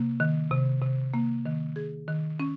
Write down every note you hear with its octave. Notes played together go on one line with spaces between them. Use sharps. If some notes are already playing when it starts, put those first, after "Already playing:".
Already playing: C3 A#3
D#3
C3
C3
A#3
D#3
G#4
D#3
C#4